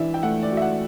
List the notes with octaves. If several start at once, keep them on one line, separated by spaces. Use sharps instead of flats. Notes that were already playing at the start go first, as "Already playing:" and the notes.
Already playing: E3 D4 D5 E5
G5
A3 F#5
D5
F#4
E5
F#5